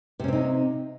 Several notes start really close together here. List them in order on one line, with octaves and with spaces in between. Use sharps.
C3 C#4 C4 D#4